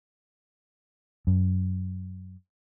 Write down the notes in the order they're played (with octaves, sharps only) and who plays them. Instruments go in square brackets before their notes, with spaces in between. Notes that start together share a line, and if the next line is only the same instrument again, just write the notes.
[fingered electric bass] F#2